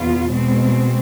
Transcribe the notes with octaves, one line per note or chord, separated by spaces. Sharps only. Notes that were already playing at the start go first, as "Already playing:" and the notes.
Already playing: E2 B2 B3 F4
B2 G#3 C4